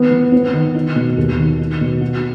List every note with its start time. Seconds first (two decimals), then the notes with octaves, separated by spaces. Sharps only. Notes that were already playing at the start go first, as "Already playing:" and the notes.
Already playing: D#3 B3
0.11 E3
0.32 B3
0.54 D#3
0.75 D#4
0.96 B2
1.17 D#2
1.38 D#3
1.59 D#4
1.81 B2
2.01 F#4